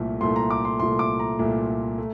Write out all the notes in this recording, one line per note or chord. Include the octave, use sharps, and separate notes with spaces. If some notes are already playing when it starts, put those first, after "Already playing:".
Already playing: C2 A#2 A3
C2 A#2 A3 C6
A#5
D6
C6
C2 A#2 A3 C6
D6
A#5
C2 A#2 A3
A3